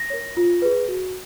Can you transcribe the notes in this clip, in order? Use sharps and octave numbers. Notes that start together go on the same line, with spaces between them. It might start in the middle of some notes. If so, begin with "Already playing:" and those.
Already playing: A#6
A#4 C#5
F4
G#4 B4
F#4